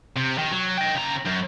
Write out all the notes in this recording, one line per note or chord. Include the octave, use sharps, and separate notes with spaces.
C3
D#3
F#3
D#5 G5
C#3 A#5
F#2